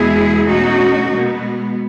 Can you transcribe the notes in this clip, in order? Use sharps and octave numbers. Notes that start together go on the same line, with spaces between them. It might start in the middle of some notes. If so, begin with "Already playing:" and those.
Already playing: E2 B2 G#3 B3 E4 G#4
B2 A3 C#4 D#4 F#4
B2 G#3 B3